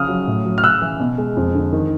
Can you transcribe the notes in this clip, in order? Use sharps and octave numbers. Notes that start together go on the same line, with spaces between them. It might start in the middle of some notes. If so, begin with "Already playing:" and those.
Already playing: C#3 F3 D#6 F6
F#3
A2
F#3
F6
C#3 E6 F#6
E3
B2
G#3
F2
D3
D#3